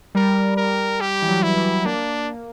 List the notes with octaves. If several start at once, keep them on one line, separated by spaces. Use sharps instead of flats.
G3 A#4
A#4
G3 G4
E3
F#3
E4
G3
A#3 D4